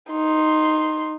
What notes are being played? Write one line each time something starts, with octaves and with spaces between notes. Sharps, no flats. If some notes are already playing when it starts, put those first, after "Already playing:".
D#4 C6